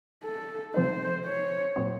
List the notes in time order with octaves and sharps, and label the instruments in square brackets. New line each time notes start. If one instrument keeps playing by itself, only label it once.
[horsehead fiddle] A4
[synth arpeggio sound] C3 F3 C4 D#4 [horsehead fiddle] C5
[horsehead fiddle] C#5
[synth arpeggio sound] A#2 F#3 C4